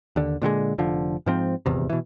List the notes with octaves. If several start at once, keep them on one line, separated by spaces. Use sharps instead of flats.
D#2 D3
A#2 D3 G3 G#3
F1 D3 F3
G#2 F3 C4
D#1 G#1 E2 C3
B2 E3